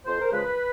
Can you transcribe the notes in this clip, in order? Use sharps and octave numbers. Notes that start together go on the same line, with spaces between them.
F2 C5
A#4
C#3 F3 G#3 B4